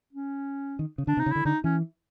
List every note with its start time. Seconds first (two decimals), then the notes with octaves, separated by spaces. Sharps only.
0.13 C#4
0.79 D#3
0.98 C#3
1.07 D3 D4
1.17 C3
1.20 D#4
1.26 C#3
1.32 D3 E4
1.45 D3 D#4
1.64 E3 C#4